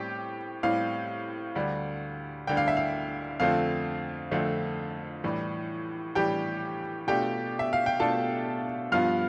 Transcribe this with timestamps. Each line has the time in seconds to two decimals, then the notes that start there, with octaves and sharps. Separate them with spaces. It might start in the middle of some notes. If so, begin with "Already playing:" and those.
Already playing: A2 G3 C4 G4 G5
0.63 A2 G3 C4 F5
1.55 D2 D3 G3
2.47 D2 D3 G3 G5
2.57 F5
2.68 E5
2.77 F5
3.40 F2 D3 A3 C4 F4 F5
4.31 F2 D3 A3 C4 F4
5.24 A2 E3 G3
6.15 A2 E3 G3 G4 G5
7.07 B2 A3 D4 F4 G4 G5
7.59 E5
7.73 F5
7.86 G5
8.00 B2 A3 D4 F4 A4 A5
8.92 G2 F3 B3 F4 F5 F6